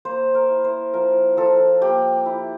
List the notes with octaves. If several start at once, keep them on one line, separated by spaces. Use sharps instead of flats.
A#3 C5
A#4
E4
C5
F3 A#4
F3 A4
A#3 G4
E4